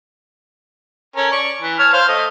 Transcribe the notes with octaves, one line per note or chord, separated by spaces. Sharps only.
C#4 A4 A#4
D5 C#6
E3
C#5 A5 F6
C5 F5
A3 D#5